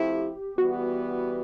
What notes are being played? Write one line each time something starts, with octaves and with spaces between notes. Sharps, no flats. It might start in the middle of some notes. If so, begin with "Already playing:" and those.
Already playing: F3 A3 C4 E4 G4
E3 G3 B3 F#4